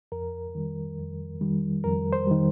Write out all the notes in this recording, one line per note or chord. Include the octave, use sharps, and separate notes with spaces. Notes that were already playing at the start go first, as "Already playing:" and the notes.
F2 A#4
D#3 G3
F2
D#3 G3
F2 A#4
C5
D#3 G3